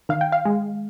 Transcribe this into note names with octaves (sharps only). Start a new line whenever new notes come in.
D#3 F5
G5
F5
G#3